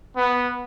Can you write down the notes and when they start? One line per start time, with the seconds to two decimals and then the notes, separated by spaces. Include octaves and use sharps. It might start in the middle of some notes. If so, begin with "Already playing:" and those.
0.16 B3